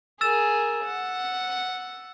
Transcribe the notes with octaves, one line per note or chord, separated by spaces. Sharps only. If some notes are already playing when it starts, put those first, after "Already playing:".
G#4 A#4 E6 A6 E7
F#5